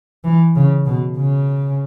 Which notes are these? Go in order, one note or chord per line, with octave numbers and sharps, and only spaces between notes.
E3
C#3
B2
C#3